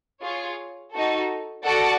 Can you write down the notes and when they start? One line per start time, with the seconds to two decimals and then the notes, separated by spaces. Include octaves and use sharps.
0.21 F4 G#4 C#5
0.92 D#4 F#4 A4
1.64 F#4 A4 D5 F#5 A5